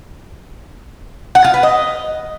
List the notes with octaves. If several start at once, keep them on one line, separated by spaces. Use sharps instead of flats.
F#5
F4
B4
D#5